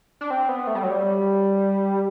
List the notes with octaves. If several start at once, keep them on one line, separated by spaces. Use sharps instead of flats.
D4
C4
B3
A3
G3
F#3
G3